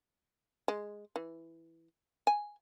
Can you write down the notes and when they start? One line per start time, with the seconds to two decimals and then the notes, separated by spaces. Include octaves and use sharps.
0.68 G#3
1.16 E3
2.27 G#5